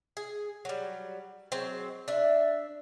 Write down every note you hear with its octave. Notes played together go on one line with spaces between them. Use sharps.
G#4
F#3 G3
F#3 G#3 C4
D4 E5